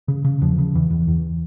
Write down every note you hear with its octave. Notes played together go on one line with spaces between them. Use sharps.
C#3
C#3
E2 F3
C#3
E2 E3
E2
E2